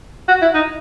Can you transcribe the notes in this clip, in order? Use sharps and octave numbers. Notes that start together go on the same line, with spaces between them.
F#4
E4
D#4